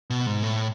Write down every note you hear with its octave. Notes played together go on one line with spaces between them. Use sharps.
B2
G#2
A2